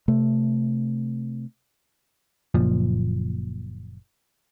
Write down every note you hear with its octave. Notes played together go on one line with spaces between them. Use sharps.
C3 A3
F#1 A#2 F3